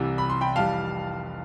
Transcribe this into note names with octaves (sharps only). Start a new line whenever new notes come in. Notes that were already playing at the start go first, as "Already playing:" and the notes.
Already playing: C2 C3 E3 G3
B5
C6
G5 B5
F1 E3 G3 F5 A5